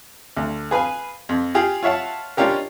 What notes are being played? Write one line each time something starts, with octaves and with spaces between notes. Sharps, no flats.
D2
G#4 B4 F5 G#5
F2
F4 G4 G#4
F4 C#5 E5 F#5 A5
G#3 C#4 D4 F4 G4 A#4